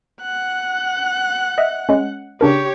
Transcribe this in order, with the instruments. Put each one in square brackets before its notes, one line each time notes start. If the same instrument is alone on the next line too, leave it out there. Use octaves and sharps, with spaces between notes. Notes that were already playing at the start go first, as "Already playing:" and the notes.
[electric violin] F#5 F#6
[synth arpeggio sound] D#5 E5
G#3 C#4
[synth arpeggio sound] C#3 D4 A#4 [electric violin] G4 C#5